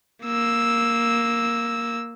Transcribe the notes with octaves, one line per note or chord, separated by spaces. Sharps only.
A#3 E6